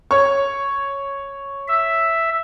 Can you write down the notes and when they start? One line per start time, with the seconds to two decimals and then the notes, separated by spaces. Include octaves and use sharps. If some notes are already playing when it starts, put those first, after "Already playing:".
0.11 C#5 C#6
1.68 E5